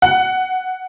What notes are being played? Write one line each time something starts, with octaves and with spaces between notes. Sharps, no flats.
F#5